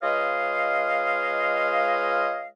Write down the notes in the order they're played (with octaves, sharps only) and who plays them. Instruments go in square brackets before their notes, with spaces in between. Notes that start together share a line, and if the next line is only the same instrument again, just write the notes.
[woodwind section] G#3 F4 B4 C#5 D#5 F5